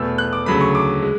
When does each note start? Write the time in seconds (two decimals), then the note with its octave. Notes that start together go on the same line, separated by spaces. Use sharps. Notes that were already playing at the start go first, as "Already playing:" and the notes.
Already playing: E2 B2 A3 E6
0.18 F#6
0.33 D6
0.46 D2 C#3 F#3 A3 B5
0.61 C#6
0.75 D6
1.03 G#3